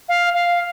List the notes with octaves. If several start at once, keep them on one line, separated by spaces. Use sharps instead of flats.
F5
F5